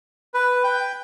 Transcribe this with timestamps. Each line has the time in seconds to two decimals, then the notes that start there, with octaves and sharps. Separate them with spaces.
0.34 B4
0.64 G5